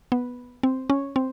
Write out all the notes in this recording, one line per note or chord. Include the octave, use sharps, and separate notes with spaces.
B3
C4
C#4
C4